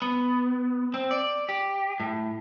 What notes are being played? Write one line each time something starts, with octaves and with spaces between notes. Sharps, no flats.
B3
C4
D5
G4
A2